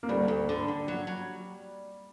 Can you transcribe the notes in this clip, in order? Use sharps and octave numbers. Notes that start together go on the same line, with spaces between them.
A#3
D2 G3
D2
D3
D3
F#3
F#3